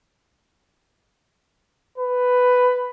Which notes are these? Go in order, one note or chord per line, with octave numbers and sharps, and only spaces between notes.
B4